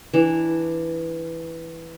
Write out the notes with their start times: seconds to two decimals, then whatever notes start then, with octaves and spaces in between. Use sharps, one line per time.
0.14 E3 D4